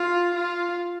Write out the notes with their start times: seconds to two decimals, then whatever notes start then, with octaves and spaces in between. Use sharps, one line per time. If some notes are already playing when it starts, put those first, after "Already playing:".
Already playing: F4
0.34 F4